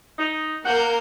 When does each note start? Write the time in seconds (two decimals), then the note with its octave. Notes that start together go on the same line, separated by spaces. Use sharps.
0.19 D#4
0.64 A#3 A#4 F#5 G6